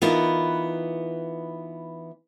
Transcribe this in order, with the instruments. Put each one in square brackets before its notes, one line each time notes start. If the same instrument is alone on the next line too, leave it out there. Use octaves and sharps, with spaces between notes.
[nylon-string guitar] E3 B3 D#4 F4 A#4